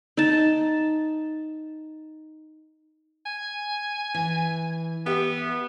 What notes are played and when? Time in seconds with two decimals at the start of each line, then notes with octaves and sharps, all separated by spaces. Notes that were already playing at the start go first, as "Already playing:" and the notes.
0.17 D#4 A5
3.26 G#5
4.14 E3
5.06 B3 G4 E5 G5